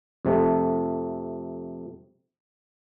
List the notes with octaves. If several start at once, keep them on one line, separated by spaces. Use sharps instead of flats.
F2 C3 A3